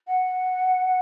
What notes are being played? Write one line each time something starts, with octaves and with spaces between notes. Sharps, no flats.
F#5